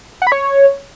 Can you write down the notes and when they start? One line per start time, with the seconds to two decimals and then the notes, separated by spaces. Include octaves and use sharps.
0.22 F#5
0.27 B5
0.32 C#5